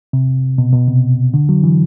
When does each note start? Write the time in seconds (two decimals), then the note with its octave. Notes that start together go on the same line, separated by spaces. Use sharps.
0.13 C3
0.58 B2
0.73 B2
0.88 C3
1.34 D3
1.49 F#3
1.64 E3